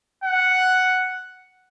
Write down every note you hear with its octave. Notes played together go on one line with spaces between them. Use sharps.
F#5